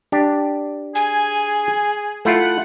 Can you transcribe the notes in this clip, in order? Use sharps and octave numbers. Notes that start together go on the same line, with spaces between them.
D4 G4
G#4 G#5
A3 E4 F4 F#5